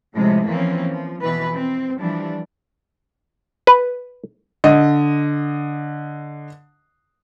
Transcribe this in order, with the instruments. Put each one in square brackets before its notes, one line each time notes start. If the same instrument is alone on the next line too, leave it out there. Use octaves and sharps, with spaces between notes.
[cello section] A2 C3 F3 G#3
E3 F3 A#3 C4 C#4
F3
F2 B2 E3 B4
C4
E3 F3 G3 D4
[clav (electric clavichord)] B4
[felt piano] D3 D#5